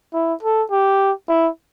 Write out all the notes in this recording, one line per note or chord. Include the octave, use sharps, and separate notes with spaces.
E4
A4
G4
E4